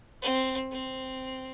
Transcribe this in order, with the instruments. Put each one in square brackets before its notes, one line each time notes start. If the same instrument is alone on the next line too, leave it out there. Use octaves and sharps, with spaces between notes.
[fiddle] C4
C4